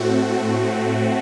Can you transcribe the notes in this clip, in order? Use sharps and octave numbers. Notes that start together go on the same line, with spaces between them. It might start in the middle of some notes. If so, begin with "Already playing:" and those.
Already playing: A2 A3 C4 F#4